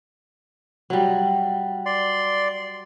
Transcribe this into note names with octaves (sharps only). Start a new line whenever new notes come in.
F#3 G3
D5 C6